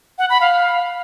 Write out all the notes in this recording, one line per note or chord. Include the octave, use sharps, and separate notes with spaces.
F#5
B5
F5